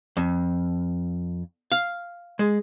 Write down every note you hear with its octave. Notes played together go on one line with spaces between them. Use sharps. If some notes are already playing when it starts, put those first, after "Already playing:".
F2
F5
G#3